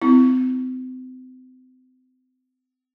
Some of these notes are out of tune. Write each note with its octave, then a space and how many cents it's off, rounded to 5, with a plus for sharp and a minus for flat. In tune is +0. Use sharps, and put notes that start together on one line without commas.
C4 -40 E4 +0